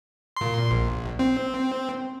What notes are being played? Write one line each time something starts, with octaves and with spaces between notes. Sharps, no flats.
A#2 C6
A#1
C4